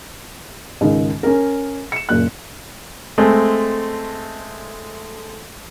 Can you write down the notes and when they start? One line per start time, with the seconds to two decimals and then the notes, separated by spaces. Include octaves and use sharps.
0.81 C#2 G#2 D#3
1.23 C#4 A#4
1.92 C#7 E7
2.09 F#1 A#2 F#6
3.18 G#3 A3 C4